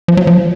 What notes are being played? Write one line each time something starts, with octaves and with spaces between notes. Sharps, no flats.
F3
F#3
F3